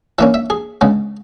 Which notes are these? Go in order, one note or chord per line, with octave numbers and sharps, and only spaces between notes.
E3 A#3 C#4 E5
E5
G#4
C#3 G#3 B3